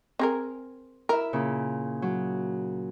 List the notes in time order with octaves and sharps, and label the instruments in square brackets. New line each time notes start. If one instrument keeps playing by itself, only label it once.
[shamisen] C4 G#4 A#4
[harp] E4 E5 [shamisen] A#4
[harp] A#2 C#3
F#3